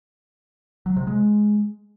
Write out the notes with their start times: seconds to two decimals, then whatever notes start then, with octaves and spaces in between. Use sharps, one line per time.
0.86 F#3
0.96 C3
1.07 G#3